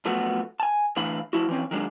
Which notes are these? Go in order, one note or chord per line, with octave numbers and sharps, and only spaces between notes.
F#2 F3 A3 B3 F#4
G#5 A5
A2 D3 E3 F5 B5
F3 E4 F#4
E3 F3 C4 C#4
D#3 F#3 G#3 D4